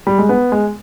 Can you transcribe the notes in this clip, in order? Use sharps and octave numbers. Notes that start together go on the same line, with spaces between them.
G3
G#3
B3
G#3